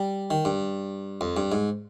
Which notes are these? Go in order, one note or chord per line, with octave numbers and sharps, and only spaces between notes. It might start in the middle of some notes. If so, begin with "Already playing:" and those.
Already playing: G3
D#3
G2
F2
G2
G#2